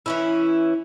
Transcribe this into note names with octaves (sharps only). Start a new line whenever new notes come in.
E3 C#4 E4